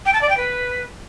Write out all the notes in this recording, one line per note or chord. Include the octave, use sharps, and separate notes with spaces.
G5
A5
D5
G5
B4